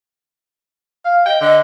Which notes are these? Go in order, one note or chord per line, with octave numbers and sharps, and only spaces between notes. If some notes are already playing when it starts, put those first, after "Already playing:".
F5
D#5 G5
D3 D#5